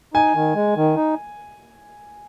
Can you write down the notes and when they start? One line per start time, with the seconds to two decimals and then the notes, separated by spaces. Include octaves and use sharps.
0.14 D#4 G#5
0.34 D#3
0.55 G#3
0.76 D#3
0.96 D#4